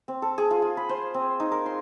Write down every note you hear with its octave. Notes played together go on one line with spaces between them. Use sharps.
C4
A4
G#4
F4
F4
B5
C5
C4
D#4
A#4
C6